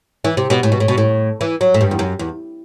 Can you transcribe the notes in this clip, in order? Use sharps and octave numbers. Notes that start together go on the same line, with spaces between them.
E3
C3
B2
A2
B2
A2
B2
A2
E3
F#3
A2
G2
E2
F#2
E2